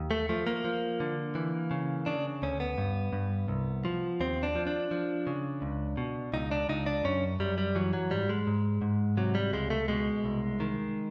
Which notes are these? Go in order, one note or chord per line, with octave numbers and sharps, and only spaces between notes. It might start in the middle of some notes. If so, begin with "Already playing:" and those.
Already playing: D#2
A3
F3 A3
A#3
F3
D3
E3
C#3
C#3 D4
D2 C#4
B3
G2
G2
C2
F3
D#2 C4
D4
F3
D4
F3
C#3
C#2
B2
C#2 D#4
D4
C#2 D#4
D4
F#2 C#4
F#2 G3
G3
E3 F#3
F#3
G#2 G3
G#3
G#2
G#2
C3 F#3
G3
C#2 G#3
A3
B2 G#3
C2
D#3